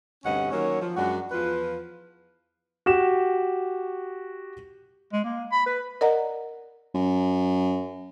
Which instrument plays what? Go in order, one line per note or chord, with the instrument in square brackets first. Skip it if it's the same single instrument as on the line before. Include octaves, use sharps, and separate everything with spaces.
[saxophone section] D2 G2 C3 C#4 D#5 F#5
D#3 F#3 A#3 C#4 C#5
F3
F#2 G#3 D4 F#4
E2 F3 F4 B4
[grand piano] F#4 G4 E7
[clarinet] G#3
A#3
B5
B4
[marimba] A#4 D5 D#5 F#5 A#5
[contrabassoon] F#2